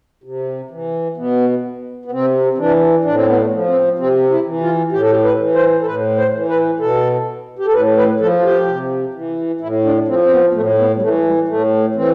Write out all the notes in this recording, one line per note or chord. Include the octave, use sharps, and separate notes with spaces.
C3
E3
B2 B3
B3
C3 C4
C4
E3 D4
A2 D4
C4
B3
A3
F3
C4
C3 C4
E4
E3
F4
A2 G4
A4
G4
B4
E3
C5
A4
A2 B4
C5
E3
B4
B2 A4
G4
A4
A2 B4
B4
F3 A4
F4
G4
C3
E3
A2 E4
D4
F3 C4
C4
B3
A2 A3
B3
G3
E3 A3
G3
A2 A3
E3 C4